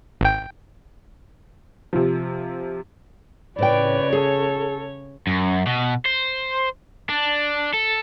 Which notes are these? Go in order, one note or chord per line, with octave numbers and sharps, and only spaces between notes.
G#1 G5
C3 F3
A2 C#3 B4 C#5 D5 G5
G#4 A4
F#2
B2
C5
D4
A4